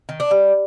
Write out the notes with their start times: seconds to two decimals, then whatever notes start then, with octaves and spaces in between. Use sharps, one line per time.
0.09 D#3
0.20 D4
0.31 G3